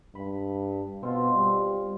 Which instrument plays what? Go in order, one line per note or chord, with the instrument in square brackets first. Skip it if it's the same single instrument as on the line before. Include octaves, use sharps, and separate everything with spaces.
[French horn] G2 [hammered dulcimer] B5
[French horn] B2 [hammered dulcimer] C4 F4
[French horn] G3